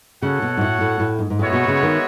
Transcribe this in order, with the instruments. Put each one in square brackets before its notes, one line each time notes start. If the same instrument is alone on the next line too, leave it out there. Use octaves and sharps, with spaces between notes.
[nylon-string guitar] C#3 [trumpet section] F#4 A4 C#5 F#5
[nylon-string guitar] B2
G#2
A2
A2
A2
G#2
G#2
[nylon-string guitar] A2 [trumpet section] G#3 B3 F#4 C#5 E5
[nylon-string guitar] B2
C#3
D#3